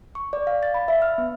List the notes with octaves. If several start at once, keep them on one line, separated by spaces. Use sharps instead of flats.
C#6
D5
F5
A6
B5
E5
F6
B3